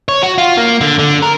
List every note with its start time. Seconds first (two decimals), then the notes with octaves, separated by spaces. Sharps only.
0.09 C#5
0.23 F#4
0.38 F4
0.58 A#3
0.81 D3
0.99 D3
1.22 A#4